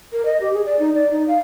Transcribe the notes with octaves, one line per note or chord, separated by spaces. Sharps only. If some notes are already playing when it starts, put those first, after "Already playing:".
A#4
D#5
G4
G#4
D5
D#4
D5
D#4
F5